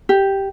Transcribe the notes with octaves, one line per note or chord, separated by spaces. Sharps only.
G4